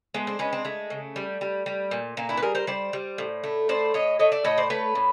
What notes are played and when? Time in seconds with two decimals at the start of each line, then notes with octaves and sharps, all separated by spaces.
0.14 G#3 A3 B3
0.27 C4 D4
0.39 G#3 B3 C#4
0.53 C4 D4
0.65 G#3 A3
0.90 C#3
1.16 G3
1.41 G3
1.66 G3
1.91 A#2
2.17 A#2 A#3
2.29 D4 E4
2.37 B4
2.42 G3 G#4 A#4
2.55 A#4 C5
2.67 G3 C5 D5
2.93 G3
3.18 A2
3.44 A3
3.69 A2 C5 D5
3.94 A2 C#5 D#5
4.19 A3 C#5 D#5
4.32 D5 E5
4.45 A2 C#5 D#5
4.58 C5 D5
4.70 A3 B4 C#5
4.95 A2